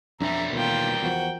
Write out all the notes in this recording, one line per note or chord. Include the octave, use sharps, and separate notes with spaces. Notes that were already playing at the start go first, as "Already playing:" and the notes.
B1 F2 G3 D4 E5 A#5
E1 D#2 B2 F4 A#4 G5
E2 F3 F#4